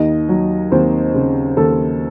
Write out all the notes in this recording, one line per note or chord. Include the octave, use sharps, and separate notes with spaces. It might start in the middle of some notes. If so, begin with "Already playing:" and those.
Already playing: D#2 D#4 D#5
F#3
D#2 C4 C5
C#3
D#2 A4